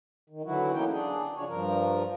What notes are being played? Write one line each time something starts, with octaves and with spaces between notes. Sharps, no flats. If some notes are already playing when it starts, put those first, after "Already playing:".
D#3
D3 E3 F#3 E4 F#4
A#3 B3 C#4 D#4 G5
D4 G#4
C#3 F3 D4 C#5
G2 F3 A#4